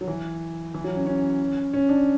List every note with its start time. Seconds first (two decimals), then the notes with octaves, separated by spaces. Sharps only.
0.01 F#3
0.07 E3
0.74 E3
0.84 F#3
0.96 C#4
1.06 C#4
1.73 C#4
1.89 D4